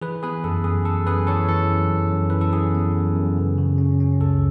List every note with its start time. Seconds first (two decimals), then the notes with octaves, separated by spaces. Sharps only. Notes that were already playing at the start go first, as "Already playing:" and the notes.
0.01 E3 G#4 B4
0.23 B3 G#4 B4
0.44 F#2 A4
0.64 F#2 G#4
0.85 F#2 A4
1.07 F#2 G#4 B4
1.27 E3 A4 C#5
1.49 E3 A4
1.69 F#2
1.91 F#2
2.12 F#2
2.30 E3 B4
2.41 A4
2.53 F#2 G#4
2.75 B3
2.95 F#2
3.16 F#2
3.37 C#3
3.58 C#3
3.78 C#4
4.00 C#4
4.20 C#2 A4